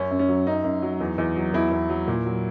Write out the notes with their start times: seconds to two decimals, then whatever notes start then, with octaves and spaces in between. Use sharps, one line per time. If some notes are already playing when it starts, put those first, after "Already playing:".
Already playing: F#2 C#4
0.11 F#2
0.19 C#4
0.29 F#3
0.47 F#2 D#4
0.64 F#2
0.82 F#3
1.01 E2
1.18 E2
1.36 F#3
1.54 E2 E4
1.72 E2
1.89 F#3
2.08 A#2
2.26 F#3